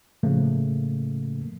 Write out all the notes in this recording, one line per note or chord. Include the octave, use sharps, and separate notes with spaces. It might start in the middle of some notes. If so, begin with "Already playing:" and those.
A2 C#3 F3 A3 A#3